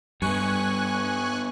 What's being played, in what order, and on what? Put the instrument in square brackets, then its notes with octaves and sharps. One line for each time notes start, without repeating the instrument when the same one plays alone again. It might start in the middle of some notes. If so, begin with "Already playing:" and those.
[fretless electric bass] G2 [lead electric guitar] G3 B3 [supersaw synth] G#5 C#6 F#6